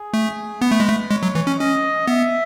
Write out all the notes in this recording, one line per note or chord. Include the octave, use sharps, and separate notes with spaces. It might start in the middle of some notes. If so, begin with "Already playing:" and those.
Already playing: G#4
A3
B3 B4
A3
G#3
A3
G#3 C#5
F#3
E3
C#4
C#4 D#5
B3 E5